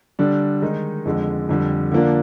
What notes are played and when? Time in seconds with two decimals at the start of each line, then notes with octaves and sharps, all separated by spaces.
0.19 D3 G3 D4
0.62 D#3 G#3 D#4
1.05 F2 D3 G#3
1.49 F2 D3 G3
1.92 D3 F3 A#3 D4